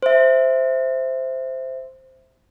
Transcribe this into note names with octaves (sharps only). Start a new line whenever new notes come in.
C5 E5